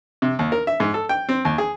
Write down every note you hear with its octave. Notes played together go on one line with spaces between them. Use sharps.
C3
D#2
A#4
E5
G#2
A4
G5
C4
D#2
G#4